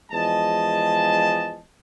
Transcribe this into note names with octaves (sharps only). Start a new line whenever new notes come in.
E2 F3 G#3 G#4 D#5 A5